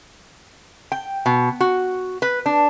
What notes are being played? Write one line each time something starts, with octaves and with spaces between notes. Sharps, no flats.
G5
B2
F#4
B4
D4